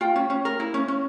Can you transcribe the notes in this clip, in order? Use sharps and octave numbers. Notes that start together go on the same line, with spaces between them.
F4 G5
C#4
C#4
A#4
E4
C#4
C#4